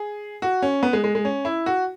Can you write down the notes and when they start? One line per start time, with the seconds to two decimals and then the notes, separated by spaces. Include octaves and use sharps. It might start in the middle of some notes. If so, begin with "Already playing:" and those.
Already playing: G#4
0.42 F#4
0.62 C#4
0.83 B3
0.93 G#3
1.04 G#3
1.15 G#3
1.25 C#4
1.45 E4
1.66 F#4